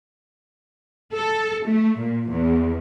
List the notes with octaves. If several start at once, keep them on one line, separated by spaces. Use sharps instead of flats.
A4
A3
A#2
E2